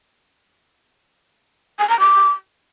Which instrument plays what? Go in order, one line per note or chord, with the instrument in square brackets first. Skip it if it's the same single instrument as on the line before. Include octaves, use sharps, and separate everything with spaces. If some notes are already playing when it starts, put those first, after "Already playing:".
[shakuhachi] G#5
A#5
D6